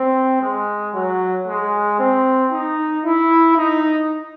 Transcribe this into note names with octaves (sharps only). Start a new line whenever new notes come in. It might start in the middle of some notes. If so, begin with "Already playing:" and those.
Already playing: C4
G#3
F#3
G#3
C4
D#4
E4
D#4